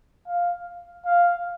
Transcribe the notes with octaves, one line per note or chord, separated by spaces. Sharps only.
F5
F5